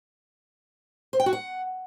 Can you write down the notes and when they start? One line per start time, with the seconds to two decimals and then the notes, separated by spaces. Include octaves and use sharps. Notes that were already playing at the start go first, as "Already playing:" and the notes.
1.13 C5
1.20 G5
1.26 F#4
1.33 F#5